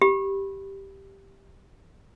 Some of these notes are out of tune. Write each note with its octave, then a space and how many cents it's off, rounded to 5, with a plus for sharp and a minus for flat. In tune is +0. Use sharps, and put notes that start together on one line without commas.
G4 +0 B5 +0